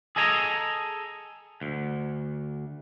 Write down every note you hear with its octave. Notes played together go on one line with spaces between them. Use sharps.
G#4 A4 D#5 G#5 A#5
D2